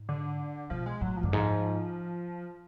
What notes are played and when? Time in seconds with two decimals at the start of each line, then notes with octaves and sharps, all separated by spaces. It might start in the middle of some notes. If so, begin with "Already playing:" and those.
Already playing: G#2
0.09 D3
0.70 B2 F3
0.86 G#3
1.01 A2 F#3
1.17 F3
1.23 F#2 D3
1.32 G#2 F3